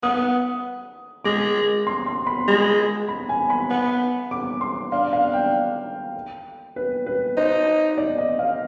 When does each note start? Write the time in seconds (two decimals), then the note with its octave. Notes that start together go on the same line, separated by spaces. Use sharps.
0.03 B3 D#6
1.24 G#3 D6
1.87 C6
2.06 C6
2.27 B5
2.48 G#3 B5
3.08 B5
3.29 G#5
3.50 B5
3.70 B3
4.31 D6
4.61 C6
4.92 D4 F5
5.13 F5
5.33 G5
6.76 B4
7.06 B4
7.37 D#4 C5
7.97 D5
8.18 D#5
8.39 F5